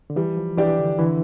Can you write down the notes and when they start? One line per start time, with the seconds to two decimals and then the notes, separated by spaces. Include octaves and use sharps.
0.10 D3
0.16 E3 G3
0.37 F3
0.58 E3 D4 G4 D5
0.79 D3
0.98 D3 E3